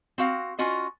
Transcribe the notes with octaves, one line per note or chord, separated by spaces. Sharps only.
C4 F#4 F5
C#4 F4 F#4 D#5